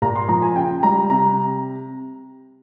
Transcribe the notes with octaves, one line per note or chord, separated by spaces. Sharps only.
A#2 A#5
C6
F3 A#5
G#5
C#3 G5
G3 A#5
C3 A#5